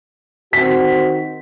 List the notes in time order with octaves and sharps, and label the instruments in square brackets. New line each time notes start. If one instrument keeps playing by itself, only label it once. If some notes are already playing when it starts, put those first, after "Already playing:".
[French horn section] D#3 C4 F#4 [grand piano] B6